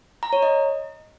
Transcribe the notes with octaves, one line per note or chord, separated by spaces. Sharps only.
A#5
C#5
D#5